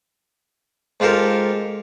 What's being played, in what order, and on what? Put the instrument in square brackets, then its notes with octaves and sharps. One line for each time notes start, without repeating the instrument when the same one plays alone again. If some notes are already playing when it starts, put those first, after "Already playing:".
[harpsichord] G#2 F4 G4 A4 A#4